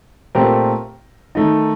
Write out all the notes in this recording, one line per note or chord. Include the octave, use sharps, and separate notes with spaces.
A#2 A3 C4 G4 A#4
D#3 A3 D#4